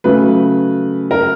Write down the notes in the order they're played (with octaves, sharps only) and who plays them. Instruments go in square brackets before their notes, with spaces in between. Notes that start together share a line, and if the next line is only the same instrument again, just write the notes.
[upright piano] C#3 F#3 A3 B4
A#4